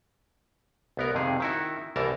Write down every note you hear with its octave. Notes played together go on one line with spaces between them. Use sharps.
C2 B3 A#4
F2 C3 D#3 G#4
D#3 E4 F#4
C2 E3 A#4 A5